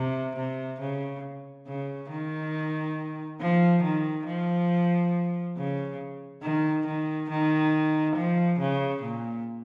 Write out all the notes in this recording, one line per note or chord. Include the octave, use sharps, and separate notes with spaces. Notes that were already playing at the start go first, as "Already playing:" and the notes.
Already playing: C3
C3
C#3
C#3
D#3
F3
D#3
F3
C#3
D#3
D#3
D#3
F3
C#3
A#2